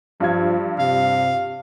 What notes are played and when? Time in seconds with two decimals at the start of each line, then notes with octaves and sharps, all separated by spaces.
0.20 G2 F3 F4 G#6
0.79 C3 F5